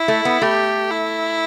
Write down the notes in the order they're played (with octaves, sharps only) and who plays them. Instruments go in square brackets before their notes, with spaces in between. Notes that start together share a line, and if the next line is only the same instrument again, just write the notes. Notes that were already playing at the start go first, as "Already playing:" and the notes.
Already playing: [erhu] E4
[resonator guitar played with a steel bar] A3
B3
[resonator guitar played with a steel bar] A3 [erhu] G4
[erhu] E4